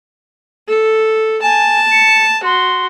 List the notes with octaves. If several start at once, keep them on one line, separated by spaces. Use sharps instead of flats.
A4
G#5 A5
C#7
F#4 C6